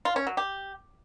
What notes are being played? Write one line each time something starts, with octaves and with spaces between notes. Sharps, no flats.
F4
C#4
F#3
G4